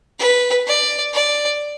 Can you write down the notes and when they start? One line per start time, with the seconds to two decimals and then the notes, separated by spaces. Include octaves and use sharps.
0.19 B4
0.67 D5
1.14 D5